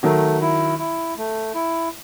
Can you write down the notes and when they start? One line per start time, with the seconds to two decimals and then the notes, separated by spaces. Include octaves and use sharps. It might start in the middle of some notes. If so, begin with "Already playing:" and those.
0.03 D#3 F#3 A3
0.41 E4
0.79 E4
1.17 A3
1.55 E4